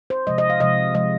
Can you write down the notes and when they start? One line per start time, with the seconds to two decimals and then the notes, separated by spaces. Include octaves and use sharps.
0.10 C5
0.27 C3 F3 G#3 D#5
0.38 D#5
0.50 F5
0.60 C3 F3 G#3 D#5
0.94 C3 F3 G#3 D#5